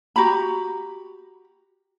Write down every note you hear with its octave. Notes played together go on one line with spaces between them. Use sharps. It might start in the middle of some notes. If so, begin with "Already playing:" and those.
F#4 G4 A#5 B5